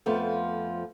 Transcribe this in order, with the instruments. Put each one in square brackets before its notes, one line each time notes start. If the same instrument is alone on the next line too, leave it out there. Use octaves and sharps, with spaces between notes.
[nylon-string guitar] F2 F3 A3 B3